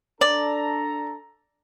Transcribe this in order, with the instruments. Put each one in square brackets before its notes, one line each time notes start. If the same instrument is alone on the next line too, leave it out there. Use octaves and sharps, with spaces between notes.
[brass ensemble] D4 A4 A#5 [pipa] D5